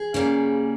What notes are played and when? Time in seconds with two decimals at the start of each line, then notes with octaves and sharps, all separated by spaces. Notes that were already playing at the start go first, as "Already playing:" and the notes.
Already playing: G#4
0.14 C#3 G3 A#3